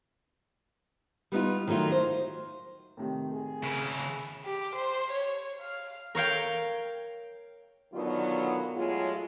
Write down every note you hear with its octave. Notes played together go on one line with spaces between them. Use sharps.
G3 B3 D#4 F4
D#3 F#3 A3 D#4 F4
C5
A2 C3 D#3
G#4
C#3 E4
G4
C5
C#5
F5
A#4 C#5 F5 G5
B2 D3 D#3 F#3 B3 F4
A2 F#3 G#3 F4